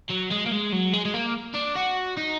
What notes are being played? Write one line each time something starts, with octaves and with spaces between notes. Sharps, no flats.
F#3
G#3
A#3
G#3
F#3
G#3
G#3
A#3
D4
F#4
D#4